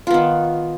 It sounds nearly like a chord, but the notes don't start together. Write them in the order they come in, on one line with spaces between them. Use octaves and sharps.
F4 B3 D#3